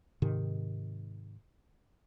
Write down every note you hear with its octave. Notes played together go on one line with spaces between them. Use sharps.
G#2 C3 D#3